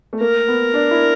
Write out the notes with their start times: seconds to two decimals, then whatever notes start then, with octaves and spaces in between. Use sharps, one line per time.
0.13 A3
0.21 A#3 A#4
0.48 B3
0.74 D4
0.91 E4